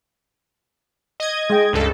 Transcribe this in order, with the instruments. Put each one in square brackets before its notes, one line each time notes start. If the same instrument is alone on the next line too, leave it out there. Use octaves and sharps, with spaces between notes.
[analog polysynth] D#5 G#6
[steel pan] G#3 G5
[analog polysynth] C#2 G2 A4